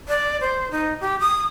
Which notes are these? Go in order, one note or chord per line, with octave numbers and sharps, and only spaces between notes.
D5
C5
D#4
G4
D#6